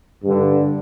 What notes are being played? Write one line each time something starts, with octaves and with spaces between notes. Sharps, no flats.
G2 D3